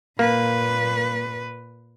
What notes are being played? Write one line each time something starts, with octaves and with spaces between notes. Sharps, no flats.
A#2 A#3 B4